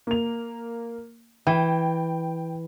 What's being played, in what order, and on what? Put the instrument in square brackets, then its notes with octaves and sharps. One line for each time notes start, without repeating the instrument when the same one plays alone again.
[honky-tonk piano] A#3 F7
[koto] E3 [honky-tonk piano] G5